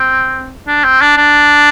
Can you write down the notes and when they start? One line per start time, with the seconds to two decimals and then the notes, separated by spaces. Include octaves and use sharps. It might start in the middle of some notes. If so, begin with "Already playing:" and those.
Already playing: C4
0.67 D4
0.84 C4
1.01 D4
1.17 D4